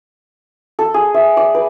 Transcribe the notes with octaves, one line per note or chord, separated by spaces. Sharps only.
A4
G#4
E5
D5
B4